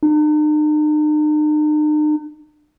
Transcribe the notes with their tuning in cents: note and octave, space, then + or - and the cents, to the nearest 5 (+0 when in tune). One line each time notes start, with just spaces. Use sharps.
D#4 -45